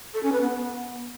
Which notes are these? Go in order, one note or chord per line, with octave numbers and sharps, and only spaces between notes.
A4
C#4
B4
B3